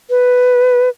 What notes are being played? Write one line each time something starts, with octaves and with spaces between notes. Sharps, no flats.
B4